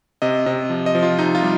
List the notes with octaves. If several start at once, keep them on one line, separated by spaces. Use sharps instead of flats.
C3 D#5
C3 D#5
F3
D#5
F3
F4
C3 D#4
F4
G3